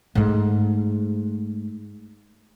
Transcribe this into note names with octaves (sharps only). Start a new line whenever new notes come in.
G#2 A3